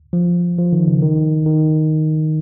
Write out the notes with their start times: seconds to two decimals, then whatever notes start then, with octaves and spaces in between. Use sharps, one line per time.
0.13 F3
0.58 F3
0.73 D#3
0.87 C#3
1.02 D#3
1.46 D#3